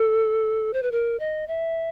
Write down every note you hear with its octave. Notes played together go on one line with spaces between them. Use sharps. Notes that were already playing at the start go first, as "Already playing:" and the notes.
Already playing: A4
C5
B4
A#4
D#5
E5